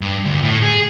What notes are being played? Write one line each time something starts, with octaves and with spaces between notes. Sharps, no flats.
G2
D2
A2
G#4